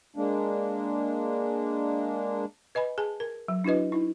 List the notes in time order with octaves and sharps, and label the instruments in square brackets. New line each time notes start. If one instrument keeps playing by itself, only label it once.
[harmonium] G#3 A#3 D4
[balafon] B4 D#5 G#5 B5
G#4 G#5 A5
A#4
F#3
D4 E4 F#4 B4 D#5
D#4 E4